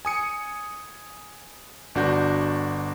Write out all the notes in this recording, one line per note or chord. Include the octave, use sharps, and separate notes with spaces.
G#5 D#6 C#7
G1 D4 F#4 G6